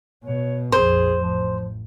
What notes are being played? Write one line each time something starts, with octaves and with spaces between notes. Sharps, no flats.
B2 C#5
A#1 F2 G#4 C5
A1 F3